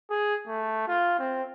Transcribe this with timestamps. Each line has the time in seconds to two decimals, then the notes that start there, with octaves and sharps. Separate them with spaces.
0.10 G#4
0.47 A3
0.88 F4
1.19 C4